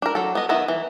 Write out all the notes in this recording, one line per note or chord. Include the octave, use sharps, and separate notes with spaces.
D4 A#4
F#3 A4
B3 D#5
D#3 B3 E4 D#5
E3